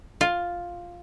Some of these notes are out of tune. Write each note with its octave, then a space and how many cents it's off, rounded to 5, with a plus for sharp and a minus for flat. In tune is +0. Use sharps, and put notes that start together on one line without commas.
F4 +5